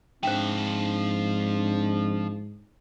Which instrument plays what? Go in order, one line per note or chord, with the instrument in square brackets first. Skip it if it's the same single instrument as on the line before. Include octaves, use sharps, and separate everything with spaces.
[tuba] G#2 [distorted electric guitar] F3 E5 [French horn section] C4 D4 [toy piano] C5 G5